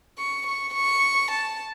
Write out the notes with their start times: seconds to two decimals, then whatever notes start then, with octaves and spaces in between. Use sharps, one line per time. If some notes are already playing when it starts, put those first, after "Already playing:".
0.18 C#6
0.47 C#6
0.74 C#6
1.31 A5